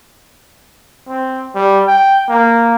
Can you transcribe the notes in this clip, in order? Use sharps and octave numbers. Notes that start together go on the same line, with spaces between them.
C4
G3
G5
A#3